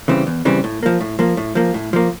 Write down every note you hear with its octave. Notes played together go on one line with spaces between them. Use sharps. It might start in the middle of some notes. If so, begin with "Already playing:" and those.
C#3 E3 G3 C4
E2
C#3 E3 G3 C4
A2
F3 A#3
A2
F3 A#3
A2
F3 A#3
A2
F3 A#3